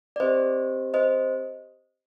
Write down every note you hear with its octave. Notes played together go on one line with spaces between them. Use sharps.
D5
C4 G4 C5 D#5
C5 D#5